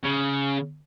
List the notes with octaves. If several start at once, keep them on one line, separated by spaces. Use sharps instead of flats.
C#3